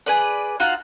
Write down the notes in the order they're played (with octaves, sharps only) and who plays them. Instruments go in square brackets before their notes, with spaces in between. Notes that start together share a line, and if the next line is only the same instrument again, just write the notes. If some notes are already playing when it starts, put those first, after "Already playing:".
[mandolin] G#4 B4 D5
D#4 F4 F#4